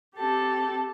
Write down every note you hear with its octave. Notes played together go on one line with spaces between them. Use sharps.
C4 G4 A4 A5